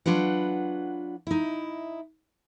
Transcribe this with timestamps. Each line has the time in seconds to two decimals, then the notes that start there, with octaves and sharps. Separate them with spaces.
0.06 F#3 D4 F4 B4 F#5
1.27 D#4 E4